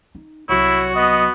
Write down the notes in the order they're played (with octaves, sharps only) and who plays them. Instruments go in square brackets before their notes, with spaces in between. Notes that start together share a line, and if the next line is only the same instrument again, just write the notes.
[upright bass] D#4
[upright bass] C2 F#3 [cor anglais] E4 [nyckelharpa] F#4 [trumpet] C#5
[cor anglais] B3 [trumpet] D#5